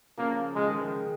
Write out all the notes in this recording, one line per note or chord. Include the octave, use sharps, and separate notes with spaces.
C#3 F3 A#3
C#3 F3 G#3
D#3 G#3
D#3 G#3